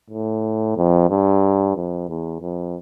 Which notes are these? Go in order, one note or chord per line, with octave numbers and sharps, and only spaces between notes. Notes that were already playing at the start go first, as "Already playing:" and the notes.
A2
F2
G2
F2
E2
F2